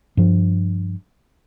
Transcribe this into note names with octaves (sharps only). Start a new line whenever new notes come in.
G2 F3